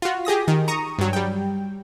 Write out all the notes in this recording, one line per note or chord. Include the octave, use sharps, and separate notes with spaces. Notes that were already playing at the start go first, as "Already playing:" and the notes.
F4 F#4
G4 G#4 D#6 A#6
D#3
A#5 C#6 D#6
G2 F#3
G3 G5